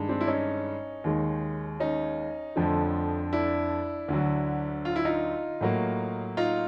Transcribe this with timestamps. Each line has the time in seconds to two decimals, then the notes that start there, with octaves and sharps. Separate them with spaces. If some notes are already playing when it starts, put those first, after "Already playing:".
Already playing: G2 D#3 G#3
0.09 C4 D4
0.21 E4
0.27 C#4 D#4
1.04 D#2 D#3 G#3
1.80 C#4 D#4
2.56 F2 D3 F3 A3
3.33 D4 E4
4.08 D2 D3 F#3
4.85 F4
4.96 E4
5.05 D#4 F4
5.61 A2 F#3 A#3
6.37 D#4 F4